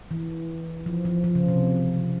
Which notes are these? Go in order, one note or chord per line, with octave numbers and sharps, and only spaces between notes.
E3
F3
F3
F3
C#3
C3